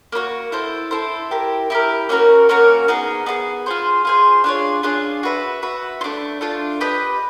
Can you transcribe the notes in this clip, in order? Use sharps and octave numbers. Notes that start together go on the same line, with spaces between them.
A#3 D#4 F#4
E4 A4 C5
E4 A4 C5
E4 G4 A#4
E4 G4 A#4
A#3 C#4 F#4 A#4
A#3 C#4 F#4 A#4
B3 D#4 G#4
B3 D#4 G#4
F4 G#4 C5
F4 G#4 C5
D4 F4 G#4 C#5
D4 F4 G#4 C#5
F#4 B4 E5
F#4 B4 E5
F4
A3 D4
A3 D4 F4
G4 B4 D#5